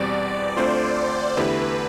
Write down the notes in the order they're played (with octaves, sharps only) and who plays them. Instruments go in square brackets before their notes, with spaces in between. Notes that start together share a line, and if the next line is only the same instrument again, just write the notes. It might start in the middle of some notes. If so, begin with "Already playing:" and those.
Already playing: [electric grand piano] E2 B2 G3 C4 [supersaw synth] D5
[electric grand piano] D2 D3 A3 C4 F4 [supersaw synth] C5
[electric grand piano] E2 D3 A3 E4 G4 [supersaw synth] B4